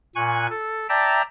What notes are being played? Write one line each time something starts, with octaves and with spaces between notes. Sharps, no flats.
A#2 G#5 C#6 F#6
A4
D5 E5 G5 A5 A#5